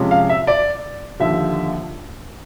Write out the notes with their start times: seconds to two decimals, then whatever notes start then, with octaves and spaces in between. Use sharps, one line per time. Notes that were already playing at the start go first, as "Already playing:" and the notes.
Already playing: C3 F3 G#3 C#4
0.11 F5
0.29 E5
0.47 D5
1.20 D#2 D3 F3 E5